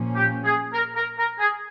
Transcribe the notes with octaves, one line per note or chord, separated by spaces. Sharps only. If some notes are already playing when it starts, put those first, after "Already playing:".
Already playing: A#2 F3 A#3 C#4
G4
G#4
A#4
A#4
A#4
G#4